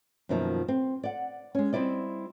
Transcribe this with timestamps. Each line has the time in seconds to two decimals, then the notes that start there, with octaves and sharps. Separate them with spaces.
0.29 F#2 B2 D#3 F3 A#3
0.68 C4
1.04 D5 F#5
1.55 G#3 C#4
1.73 G3 C4 E4 D5 D#5